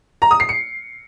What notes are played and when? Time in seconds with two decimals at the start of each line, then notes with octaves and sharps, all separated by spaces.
0.22 A#5
0.31 D#6
0.40 C7
0.49 C#7